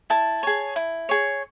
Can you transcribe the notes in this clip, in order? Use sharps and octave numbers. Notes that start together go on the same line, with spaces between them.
E4 A5
G#4 C#5
E4
G#4 C#5